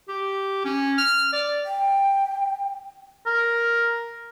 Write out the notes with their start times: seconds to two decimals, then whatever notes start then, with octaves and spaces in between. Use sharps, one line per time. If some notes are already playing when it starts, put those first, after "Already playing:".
0.09 G4
0.65 C#4
0.98 F6
1.33 D5
1.65 G5
3.26 A#4